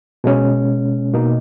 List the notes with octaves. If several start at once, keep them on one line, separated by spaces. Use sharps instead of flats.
B2 G#3 C#4
B2 A#3 D#4